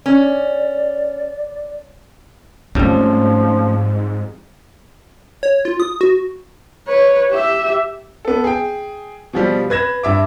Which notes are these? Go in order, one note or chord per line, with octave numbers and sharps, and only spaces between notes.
C#4 D5
F2 G#2 F3 G3 A3 C#4
C#5
F4
D#6
F#4
B4 C#5
G4 E5
B3 A4
G#4 G5
B2 F3 G3
B4 G#6 A#6 E7
G2 E5 D6